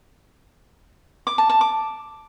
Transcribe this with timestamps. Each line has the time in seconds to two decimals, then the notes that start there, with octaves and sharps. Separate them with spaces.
1.27 D6
1.38 A5
1.49 A5
1.61 D6